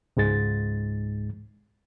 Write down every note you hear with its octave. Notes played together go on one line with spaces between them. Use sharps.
C#2 G#2 G#3 A6